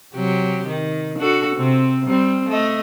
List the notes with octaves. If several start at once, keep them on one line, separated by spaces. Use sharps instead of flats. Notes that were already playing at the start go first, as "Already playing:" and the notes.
C3 F#3 G4
D#3
D4 F#4 A4
C3 C4
G3 C4
A3 D#5